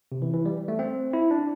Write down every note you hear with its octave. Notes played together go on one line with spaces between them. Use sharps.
C3
E3
E3
G3
A3
C4
E4
D4